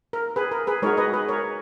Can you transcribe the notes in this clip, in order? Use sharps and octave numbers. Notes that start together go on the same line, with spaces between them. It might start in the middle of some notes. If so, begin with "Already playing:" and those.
A#4
G#4 B4
A#4
G#4 B4
G#3 D#4 F#4 A#4 C#5
B4 D#5
G#4 B4
A#4 C#5